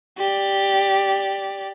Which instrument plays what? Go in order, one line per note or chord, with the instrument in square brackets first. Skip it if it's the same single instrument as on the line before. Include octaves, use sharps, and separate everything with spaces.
[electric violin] G4 D5